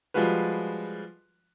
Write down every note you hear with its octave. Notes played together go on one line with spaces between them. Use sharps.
F3 G3 G#3 F4 F#4 B4